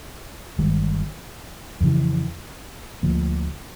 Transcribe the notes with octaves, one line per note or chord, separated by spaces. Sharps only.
G1 G2 D#3 G#3
F2 C#3 E3
D2 D3 F3 A#3